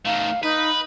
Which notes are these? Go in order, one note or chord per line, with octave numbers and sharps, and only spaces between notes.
D#3 A3 F5
D#4 B4